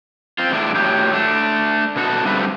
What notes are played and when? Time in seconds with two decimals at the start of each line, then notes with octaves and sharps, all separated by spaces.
0.38 C4 F4
0.51 E2 A2 D4 E4
0.75 A2 F#3 G4
1.13 A3 D4
1.96 B2 F#4 A4
2.24 G2 D3 G3 A3 C4 B4